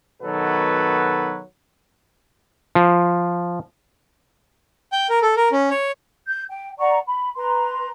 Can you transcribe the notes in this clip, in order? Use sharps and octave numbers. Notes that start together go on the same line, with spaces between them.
B2 D#3 F#3 B3 A4 B4
F3
G5
A#4
A4
A#4
C#4
C#5
G6
G5
D5 F#5 A#5 C#6
B5
B4 A#5 C6